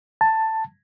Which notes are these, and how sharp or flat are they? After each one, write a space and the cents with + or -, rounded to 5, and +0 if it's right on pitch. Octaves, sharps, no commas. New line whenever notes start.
A5 +10